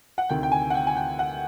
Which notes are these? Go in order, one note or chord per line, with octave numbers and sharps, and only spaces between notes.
F#5
D2 C3 D#3 G5
G5
G#5
F#5
G5
G#5
G5
F#5